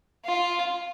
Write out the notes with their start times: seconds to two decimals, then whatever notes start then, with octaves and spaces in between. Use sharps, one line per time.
0.25 F4